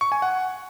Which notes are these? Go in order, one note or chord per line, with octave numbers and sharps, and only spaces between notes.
C#6
G#5
F#5